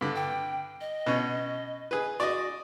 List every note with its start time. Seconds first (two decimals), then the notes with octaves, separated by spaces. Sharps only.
0.01 G2 D3
0.16 G5
0.81 D#5
1.06 B2 C#4
1.91 G#4 B4
2.20 F#4 D5 D#5